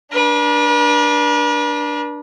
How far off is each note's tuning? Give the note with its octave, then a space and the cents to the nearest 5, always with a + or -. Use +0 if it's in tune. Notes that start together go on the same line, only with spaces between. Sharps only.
D4 +0 B4 -45